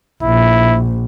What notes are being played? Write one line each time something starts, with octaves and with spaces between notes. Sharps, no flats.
A#1 E4